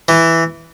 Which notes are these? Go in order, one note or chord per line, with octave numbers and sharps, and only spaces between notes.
E3